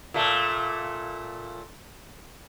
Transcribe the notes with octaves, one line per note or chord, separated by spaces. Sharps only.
A#2 A3